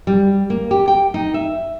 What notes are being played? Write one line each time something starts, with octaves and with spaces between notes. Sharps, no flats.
G3
A#3
G4
G5
D#4
E5